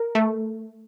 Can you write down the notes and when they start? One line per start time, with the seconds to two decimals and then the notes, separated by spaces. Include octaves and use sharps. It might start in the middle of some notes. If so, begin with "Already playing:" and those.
Already playing: A#4
0.15 A3